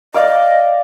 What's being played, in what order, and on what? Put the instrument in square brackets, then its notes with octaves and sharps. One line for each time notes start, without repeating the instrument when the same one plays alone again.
[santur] D5 F5 D6 [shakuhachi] D#5